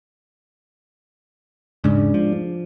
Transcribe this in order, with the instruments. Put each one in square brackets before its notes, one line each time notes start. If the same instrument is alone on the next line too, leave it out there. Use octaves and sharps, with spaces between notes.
[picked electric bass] E1 G#2 C#3 [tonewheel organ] G#3 D4
[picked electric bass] F3